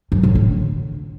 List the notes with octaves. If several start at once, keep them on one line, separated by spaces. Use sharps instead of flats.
F#2
A2
D3